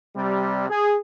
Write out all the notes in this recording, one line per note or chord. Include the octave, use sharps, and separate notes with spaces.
C3 G3
G#4